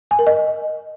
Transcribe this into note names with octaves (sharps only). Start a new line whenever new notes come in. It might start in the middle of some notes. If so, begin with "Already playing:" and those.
G#5
A#4
D#5